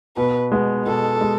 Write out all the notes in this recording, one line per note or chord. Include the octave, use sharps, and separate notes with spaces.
B2 B4
G#3 B3
B2 A4
G#3